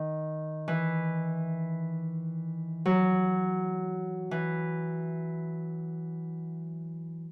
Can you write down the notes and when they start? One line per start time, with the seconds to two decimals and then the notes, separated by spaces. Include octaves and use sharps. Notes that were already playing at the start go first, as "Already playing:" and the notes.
Already playing: D#3
0.68 E3
2.85 F#3
4.31 E3